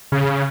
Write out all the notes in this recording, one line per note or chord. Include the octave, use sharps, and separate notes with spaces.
C#3